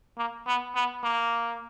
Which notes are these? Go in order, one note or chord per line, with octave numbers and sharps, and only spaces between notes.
A#3
B3
B3
A#3